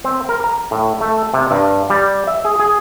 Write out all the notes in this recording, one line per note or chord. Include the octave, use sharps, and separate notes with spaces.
C4
A#4
A#5
A2
A3
C3
G2
G3
E5
G#4
G#4